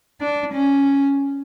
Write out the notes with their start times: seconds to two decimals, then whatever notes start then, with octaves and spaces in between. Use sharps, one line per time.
0.21 D4
0.54 C#4